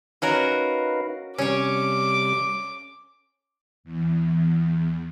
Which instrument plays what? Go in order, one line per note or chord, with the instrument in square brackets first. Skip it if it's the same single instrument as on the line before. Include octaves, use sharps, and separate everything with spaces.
[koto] C#4 F#4 A#4 [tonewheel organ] D#4 B4 F5
[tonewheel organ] C3 G3 [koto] C#4 C#5 [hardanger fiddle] D6
[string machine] E2